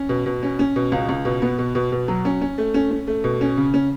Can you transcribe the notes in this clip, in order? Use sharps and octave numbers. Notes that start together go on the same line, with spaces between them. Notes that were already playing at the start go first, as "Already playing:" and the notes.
Already playing: C#4
B2
B2
C#4
C#4
B2
C#2
C#2
B2
B3
B2
B2
B2
F#3
C#4
C#4
A3
C#4
C#4
A3
B2
C#4
C#3
C#4